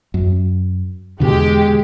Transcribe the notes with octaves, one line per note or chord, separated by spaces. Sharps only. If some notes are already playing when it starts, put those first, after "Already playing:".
F#2
E2 B2 D3 G#3 G4